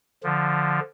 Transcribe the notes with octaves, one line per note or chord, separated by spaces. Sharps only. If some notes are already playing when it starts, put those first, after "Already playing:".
D3 F3